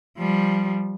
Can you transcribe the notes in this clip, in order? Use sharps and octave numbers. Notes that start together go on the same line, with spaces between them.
F3 G3